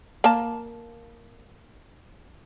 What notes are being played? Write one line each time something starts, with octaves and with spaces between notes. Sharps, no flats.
A#3 A5